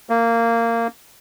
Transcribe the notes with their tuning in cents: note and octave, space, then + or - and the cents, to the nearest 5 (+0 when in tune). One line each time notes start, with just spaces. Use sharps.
A#3 -15